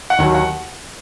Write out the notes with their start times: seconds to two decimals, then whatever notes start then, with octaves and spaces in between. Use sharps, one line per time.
0.10 F#5
0.18 D#2 D#3 F#3
0.35 F#5